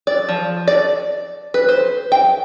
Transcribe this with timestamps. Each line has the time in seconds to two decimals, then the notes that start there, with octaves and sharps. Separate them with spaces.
0.07 D5
0.29 F3
0.68 D5
1.54 B4
1.69 C5
2.12 G5